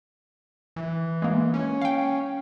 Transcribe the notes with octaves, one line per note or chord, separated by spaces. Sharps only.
E3
G#3 A#3
C#4
F5 G5